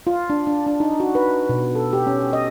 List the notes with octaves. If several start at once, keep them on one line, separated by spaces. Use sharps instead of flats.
F4
D4
D4
D4
D#4
F#4
B4
B2
A4
G4
C#4
D#5